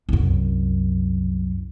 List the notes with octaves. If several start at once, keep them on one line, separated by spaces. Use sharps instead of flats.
C2 F#2